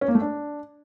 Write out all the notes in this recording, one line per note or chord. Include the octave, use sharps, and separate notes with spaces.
C#4
A#3
A3
D4